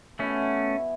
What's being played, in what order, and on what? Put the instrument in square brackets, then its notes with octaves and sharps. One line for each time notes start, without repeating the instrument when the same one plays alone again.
[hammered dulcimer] B2 B3 E4 [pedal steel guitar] A3 C#4